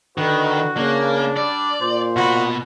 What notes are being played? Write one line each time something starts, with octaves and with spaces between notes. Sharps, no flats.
D3 D#3 F#4 B4
C#3 A#3 D4
G3 D5
A#2 C5
B2 F#4 B5